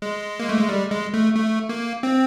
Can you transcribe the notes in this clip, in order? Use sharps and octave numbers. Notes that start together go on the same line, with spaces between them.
G#3
A#3
A3
G#3
G3
G#3
A3
A3
A#3
C4